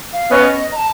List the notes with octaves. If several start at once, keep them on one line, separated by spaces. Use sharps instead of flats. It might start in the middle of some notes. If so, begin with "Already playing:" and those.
F5
B3 C#4 D#5
A#5
A5